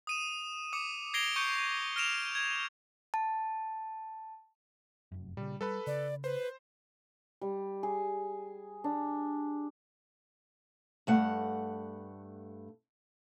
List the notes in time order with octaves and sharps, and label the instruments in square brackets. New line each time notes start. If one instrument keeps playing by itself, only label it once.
[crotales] D#6 D#7 E7
D6 D#6 C#7
G#6 A#6 C7 D7 F7 G7
C#6 G6 C#7
F6 A#6 D7 E7 F7
G#6
[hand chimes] A5
[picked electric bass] F1 F#2
[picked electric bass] A#2 C#3 [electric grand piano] G3
[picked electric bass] G3 [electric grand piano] A4 B4 B5
[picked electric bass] C#3 [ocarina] D5
[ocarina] B4 [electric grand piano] C5
[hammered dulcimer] G3
G#4
D4
[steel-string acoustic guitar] G2 A3 F#5